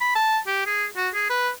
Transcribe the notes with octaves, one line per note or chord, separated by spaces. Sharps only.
B5
A5
G4
G#4
F#4
G#4
B4